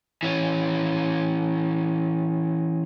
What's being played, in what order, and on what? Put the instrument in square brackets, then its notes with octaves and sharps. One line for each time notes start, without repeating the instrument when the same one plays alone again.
[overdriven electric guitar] E3 C#4